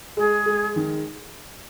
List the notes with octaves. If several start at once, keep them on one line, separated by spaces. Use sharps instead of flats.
G#3 G#4
G#3
D#3